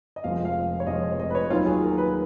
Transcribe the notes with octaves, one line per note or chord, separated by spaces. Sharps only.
D#5
F1 F2 F3 G#3 F5
F5
C#5
F1 F2 F3 G#3 D#5
D#5
B4
C#5
D#2 D#3 F#3 F4
G#4
A#4
B4